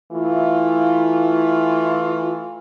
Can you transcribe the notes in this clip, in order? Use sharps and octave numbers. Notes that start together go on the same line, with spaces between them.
E3 A3 E4 F4